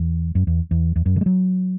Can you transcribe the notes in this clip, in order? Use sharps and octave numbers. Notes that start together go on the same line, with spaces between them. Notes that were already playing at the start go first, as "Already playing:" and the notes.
Already playing: E2
F#2
E2
E2
E2
F#2
D3
G#3
F#3